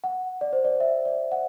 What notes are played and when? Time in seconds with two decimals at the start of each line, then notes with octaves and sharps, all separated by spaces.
0.04 F#5
0.41 D5
0.53 C5
0.65 D5
0.80 E5
1.05 D5
1.32 F#5